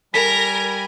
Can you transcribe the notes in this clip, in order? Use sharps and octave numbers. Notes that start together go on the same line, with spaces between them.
G3 A#4 G#5 B5 B6